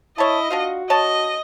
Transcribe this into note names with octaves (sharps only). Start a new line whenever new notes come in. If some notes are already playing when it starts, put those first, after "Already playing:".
E4 C#5 D#5 A5
D4 F4 F#4 F5
C#5 D#5 A5